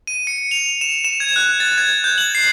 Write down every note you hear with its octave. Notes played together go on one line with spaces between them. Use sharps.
D#7
C#7
F7
E7
E7
G#6
F#6
A6
G#6
G6
F#7
C7